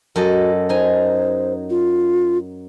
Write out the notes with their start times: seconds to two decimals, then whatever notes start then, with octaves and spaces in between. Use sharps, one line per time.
0.16 F#2 F#4 A4 D#5
0.69 D#4 C5 G#5
1.70 F4